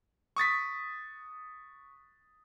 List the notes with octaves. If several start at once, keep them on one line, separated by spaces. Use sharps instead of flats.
C#6 D#6 A6 B6